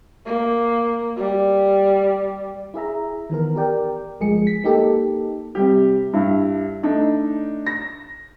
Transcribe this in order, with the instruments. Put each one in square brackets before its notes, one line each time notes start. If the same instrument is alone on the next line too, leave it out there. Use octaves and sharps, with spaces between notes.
[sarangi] A#3
G3
[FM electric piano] E4 G#4 E5 A#5
D#3 E3 B3 A#4
G4 A#4 D5 G5
G1 F3 G#3 G#4 C#7
B6
A#3 D#4 G4 A4
[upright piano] C3 G3 G4
G2 E4
A3 D4 D#4
A#6